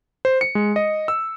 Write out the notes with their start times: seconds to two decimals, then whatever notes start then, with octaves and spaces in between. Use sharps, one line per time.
0.25 C5
0.41 C#7
0.55 G#3
0.76 D#5
1.08 E6